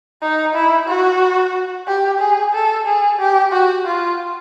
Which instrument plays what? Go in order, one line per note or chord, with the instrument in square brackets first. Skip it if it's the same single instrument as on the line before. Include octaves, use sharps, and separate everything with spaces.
[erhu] D#4
E4
F#4
G4
G#4
A4
G#4
G4
F#4
F4